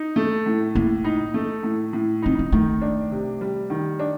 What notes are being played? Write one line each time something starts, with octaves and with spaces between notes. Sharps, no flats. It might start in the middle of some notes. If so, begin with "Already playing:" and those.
Already playing: D#4
A3
A2
A2 A#3
D#4
A3
A2
A2
C4 D#4
A#3
D#3 A3
D4
C3
G3
D#3
D4